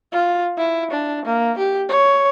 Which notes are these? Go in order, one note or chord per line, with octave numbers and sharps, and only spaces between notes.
F4
E4
D4
A#3
G4
C#5